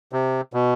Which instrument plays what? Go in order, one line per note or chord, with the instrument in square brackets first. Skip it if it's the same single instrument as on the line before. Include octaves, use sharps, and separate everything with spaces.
[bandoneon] C3
B2